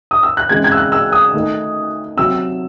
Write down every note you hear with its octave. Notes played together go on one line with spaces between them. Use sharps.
D#6
E6
F#6
C#3 E3 G#3 C4 G#6
G#6
E6
F#6
E6
D#6
D#3 A3 D#4
C3 F#3 C4 E6